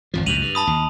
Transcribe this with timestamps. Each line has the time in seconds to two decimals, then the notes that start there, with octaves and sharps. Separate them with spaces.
0.14 G#1 F2 F3
0.26 C#2 F#2 A#2 D#7 F7 F#7
0.41 G2
0.55 A5 B5 D#6
0.67 D#2